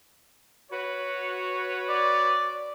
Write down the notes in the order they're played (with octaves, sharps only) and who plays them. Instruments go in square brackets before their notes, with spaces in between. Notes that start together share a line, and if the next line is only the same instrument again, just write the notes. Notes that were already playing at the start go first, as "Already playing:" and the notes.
[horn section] F#4 B4 C#5
[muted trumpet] D5